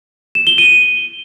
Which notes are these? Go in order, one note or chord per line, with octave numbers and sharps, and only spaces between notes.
E7
G7
D#7